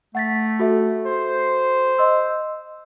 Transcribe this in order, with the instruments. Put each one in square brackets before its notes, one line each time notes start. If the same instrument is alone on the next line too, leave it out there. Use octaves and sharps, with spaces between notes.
[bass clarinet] A3 [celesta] F#5 A6 B6
[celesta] F#4 A4 E5
[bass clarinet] C5
[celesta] D#5 C6 E6